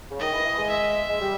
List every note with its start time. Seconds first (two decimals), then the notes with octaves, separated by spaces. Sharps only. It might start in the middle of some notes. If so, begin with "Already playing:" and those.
0.10 C#3
0.20 D#3 D#5
0.32 E3
0.45 E3
0.57 G#3
0.70 E5
1.08 G#3
1.20 G3